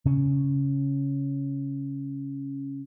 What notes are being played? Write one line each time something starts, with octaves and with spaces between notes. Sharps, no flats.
C#3 C#4